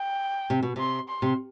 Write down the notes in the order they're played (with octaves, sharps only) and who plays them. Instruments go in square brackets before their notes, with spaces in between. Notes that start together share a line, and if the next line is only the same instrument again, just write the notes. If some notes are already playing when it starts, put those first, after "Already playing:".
Already playing: [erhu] G5
[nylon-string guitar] C3
B2
[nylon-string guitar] C3 [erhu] C6
[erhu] C6
[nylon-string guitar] C3